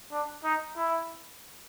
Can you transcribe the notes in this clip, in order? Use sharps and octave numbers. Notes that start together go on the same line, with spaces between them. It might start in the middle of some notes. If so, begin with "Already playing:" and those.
D4
D#4
E4